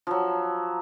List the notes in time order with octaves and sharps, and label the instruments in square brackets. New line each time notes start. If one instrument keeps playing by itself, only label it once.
[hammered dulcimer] F3 F#3